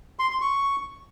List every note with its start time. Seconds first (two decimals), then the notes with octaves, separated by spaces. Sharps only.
0.19 C6
0.30 C6
0.41 C#6